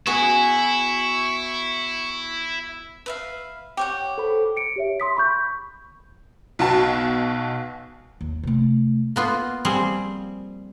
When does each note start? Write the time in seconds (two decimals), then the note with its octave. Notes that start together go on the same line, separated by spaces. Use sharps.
0.07 B3 E4 F#4 G#4 C#6
3.06 B4 E5 F5
3.77 G4 C#5 F#5 G5
4.18 A4 C5 B5
4.57 C#7 D7
4.76 G4 C#5 E5
5.00 C6 D#6 B6
5.17 B5 C#6 G6
6.59 B1 B2 F#4 A5
8.21 D#2
8.43 C3 A3
9.16 A#3 B3 F4
9.65 F3 G3 C4 G#4